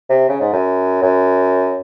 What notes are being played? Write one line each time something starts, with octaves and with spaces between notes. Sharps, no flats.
C3
C#3
G#2
F#2
F#2